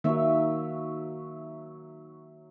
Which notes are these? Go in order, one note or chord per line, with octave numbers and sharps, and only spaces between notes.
D#3 F#3 A#3 D#4 C#5 E5